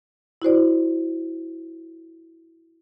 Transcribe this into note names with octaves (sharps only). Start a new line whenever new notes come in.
E4 F#4 C5 D5